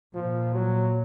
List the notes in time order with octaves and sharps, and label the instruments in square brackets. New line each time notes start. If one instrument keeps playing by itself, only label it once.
[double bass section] A#2 [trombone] F3
[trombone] F#3